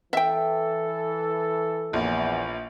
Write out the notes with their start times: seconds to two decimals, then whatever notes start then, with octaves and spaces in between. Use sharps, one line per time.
0.13 E3 A4 E5 G5
1.93 A#1 E2